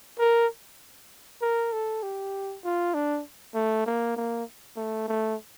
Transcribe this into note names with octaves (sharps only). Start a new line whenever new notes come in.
A#4
A#4
A4
G4
F4
D4
A3
A#3
A#3
A3
A3